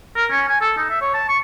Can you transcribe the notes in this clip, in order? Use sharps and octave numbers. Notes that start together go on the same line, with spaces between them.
A#4
C#4
G#5
A4
D#4
E5
C#5
A5
C#6